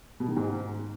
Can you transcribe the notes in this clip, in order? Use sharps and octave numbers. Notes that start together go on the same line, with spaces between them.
B2
D#3
G#2